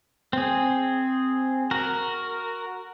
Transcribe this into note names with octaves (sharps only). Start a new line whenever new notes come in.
C4 G#4
F#4 A#4